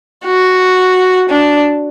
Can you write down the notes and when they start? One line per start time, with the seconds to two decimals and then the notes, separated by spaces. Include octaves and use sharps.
0.25 F#4
1.29 D4